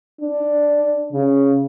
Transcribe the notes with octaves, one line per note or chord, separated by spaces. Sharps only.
D4
C#3